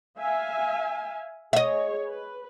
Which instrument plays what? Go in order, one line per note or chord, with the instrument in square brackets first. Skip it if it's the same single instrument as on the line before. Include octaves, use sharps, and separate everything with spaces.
[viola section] E5 F5 G#5
[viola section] G#4 C#5 [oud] D#5 E5
[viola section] B4